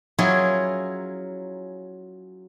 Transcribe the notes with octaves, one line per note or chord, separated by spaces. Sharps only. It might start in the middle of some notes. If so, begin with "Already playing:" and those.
F#3 C#4 E4 F4 G#4 A#4